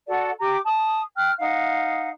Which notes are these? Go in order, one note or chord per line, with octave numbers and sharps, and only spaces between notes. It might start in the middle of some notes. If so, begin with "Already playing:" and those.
F#4 A4 D5 F#5
G4 A#5 D6
A5 D#6
G5 F6 F#6
D#4 F5 F#5